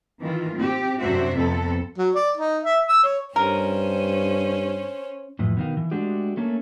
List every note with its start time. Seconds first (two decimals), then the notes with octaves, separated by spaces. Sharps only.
0.19 D#3 E3 F4
0.56 C4 G4
0.99 F#2 C3 D4 F#4 C5 E5
1.36 F2 B3 C4 A4
1.98 F#3
2.15 D5
2.37 D#4
2.63 E5
2.88 E6
3.04 C#5
3.36 G2 C#4 A#4 C5
5.39 F2 A2 E3
5.57 B2 D#3 F5
5.77 E3
5.91 G#3 A3 D4 F#4 G4
6.37 A3 A#3 C#4 A4